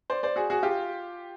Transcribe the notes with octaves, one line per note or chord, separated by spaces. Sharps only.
C5 D5
C5 D5
F#4 G#4
F#4 G#4
F4 G4